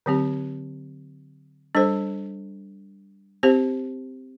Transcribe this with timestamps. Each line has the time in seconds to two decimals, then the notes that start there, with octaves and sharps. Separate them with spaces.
0.06 D3 F#3 C4 G4
1.75 G3 D4 A4 C5
3.43 C4 G4 C5